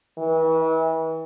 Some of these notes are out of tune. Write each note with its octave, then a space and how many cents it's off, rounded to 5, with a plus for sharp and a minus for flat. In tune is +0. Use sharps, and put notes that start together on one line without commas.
E3 -35